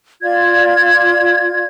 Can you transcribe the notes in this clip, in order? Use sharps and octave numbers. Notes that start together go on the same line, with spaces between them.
F4 D5 G#6